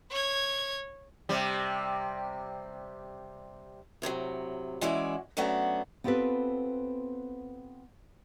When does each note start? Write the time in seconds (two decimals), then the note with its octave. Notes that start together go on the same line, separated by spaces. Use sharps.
0.11 C#5 G#6
1.29 C3 G3
4.02 A2 C3 E3 F#3
4.81 E3 G#3 C#4 E4 F#4 D5
5.37 F#3 A3 B3 C#4 D4 F#4
6.04 B3 C4 F4 G4 A4 B4